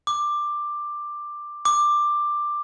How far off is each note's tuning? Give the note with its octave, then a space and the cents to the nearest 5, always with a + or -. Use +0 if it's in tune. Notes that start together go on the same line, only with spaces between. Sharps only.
D6 +10
D6 +10